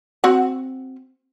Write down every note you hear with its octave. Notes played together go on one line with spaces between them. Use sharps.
C4 F#4 F#5